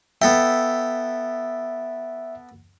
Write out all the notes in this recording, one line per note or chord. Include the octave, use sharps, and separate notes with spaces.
B3 A4 E5 G5